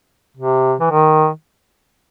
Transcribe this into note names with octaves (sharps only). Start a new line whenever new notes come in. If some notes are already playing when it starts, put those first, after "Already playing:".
C3
E3
D#3